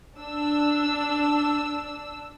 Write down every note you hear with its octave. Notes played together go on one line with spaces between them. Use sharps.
D4 E6